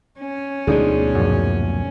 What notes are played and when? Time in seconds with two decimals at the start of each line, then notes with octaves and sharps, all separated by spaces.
0.20 C#4
0.67 D2 B2 F3 G#3 D4 D#4
1.15 A#1 F#2